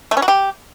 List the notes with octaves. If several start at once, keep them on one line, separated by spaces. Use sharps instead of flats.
A3
C#4
F#4
G4